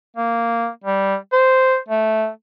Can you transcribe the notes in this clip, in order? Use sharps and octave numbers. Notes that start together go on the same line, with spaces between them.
A#3
G3
C5
A3